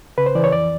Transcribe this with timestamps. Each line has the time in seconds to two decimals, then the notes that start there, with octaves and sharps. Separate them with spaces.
0.18 C#3 B4
0.26 C5
0.35 E3 D5
0.44 C#5
0.52 F2 D5